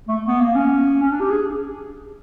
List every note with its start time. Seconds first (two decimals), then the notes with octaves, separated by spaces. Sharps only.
0.08 A3
0.27 B3
0.41 A#3
0.55 C#4
1.02 C#4
1.12 D4
1.20 G4
1.31 G#4